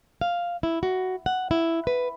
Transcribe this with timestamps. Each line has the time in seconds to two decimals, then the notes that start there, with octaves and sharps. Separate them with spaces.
0.21 F5
0.63 E4
0.83 F#4
1.26 F#5
1.51 E4
1.87 B4